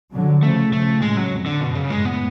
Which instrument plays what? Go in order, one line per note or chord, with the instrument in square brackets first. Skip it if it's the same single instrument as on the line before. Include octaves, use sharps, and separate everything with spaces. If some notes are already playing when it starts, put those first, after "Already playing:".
[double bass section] D3 F#3
[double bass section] C#3 F3 [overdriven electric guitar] A3
[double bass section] C#3 F3 [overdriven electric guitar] A3
[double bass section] A2 C#3 [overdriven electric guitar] G#3
[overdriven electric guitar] F#3
[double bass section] F2
[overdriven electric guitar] D3
[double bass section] F#2 [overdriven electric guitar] B2
[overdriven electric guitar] C#3
[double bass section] F#2 A2 [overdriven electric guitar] G#3
[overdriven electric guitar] B3